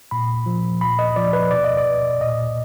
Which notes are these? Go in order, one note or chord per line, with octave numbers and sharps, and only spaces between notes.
A#2 B5
F3
A#2 B5
D#5
F3 D5
B4
B2 D5
D#5
D5
A#2 D#5